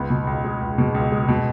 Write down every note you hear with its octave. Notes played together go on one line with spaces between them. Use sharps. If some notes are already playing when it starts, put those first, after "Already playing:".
Already playing: C#2 B3
B2
C#2
G#3
C#2
B2
C#2
G#3
B2